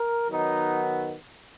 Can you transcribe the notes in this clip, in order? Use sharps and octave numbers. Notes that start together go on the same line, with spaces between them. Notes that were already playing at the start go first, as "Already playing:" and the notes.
Already playing: A#4
D#3 F#3 B3 D#4